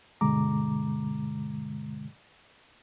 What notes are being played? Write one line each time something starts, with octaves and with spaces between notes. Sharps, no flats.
G2 B2 D3 G#3 A#5 D6